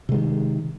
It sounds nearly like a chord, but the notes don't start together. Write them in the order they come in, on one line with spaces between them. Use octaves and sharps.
C3 G#3 D#3